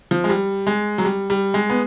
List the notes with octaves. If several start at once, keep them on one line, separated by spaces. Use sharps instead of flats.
F3
G#3
G3
G#3
F#3
G3
G3
G#3
B3